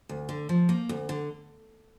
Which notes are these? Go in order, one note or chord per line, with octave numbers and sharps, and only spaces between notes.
D2
D3
F3
A#3
D2
D3